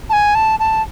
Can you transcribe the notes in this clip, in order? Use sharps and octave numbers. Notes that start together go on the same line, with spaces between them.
A5
G#5
A5
A5